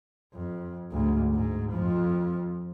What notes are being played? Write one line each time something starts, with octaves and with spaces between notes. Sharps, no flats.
F2
D2 G#2
G#2
F2 F3